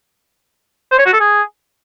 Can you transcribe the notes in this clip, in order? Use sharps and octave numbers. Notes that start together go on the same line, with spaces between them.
C5
C#5
F#4
A4
G#4